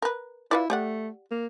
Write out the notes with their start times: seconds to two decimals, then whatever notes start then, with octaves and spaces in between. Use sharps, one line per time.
0.02 A#4 B4
0.51 E4 F4 B4 D5
0.70 A3 G4 D5 F#5
1.31 A#3